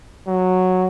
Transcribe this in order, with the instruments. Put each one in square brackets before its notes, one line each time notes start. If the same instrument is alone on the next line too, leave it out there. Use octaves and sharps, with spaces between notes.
[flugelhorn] F#3